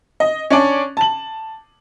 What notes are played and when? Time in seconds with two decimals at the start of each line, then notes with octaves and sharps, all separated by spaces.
0.20 D#5
0.50 C#4 D4 D5
0.97 A5 F#7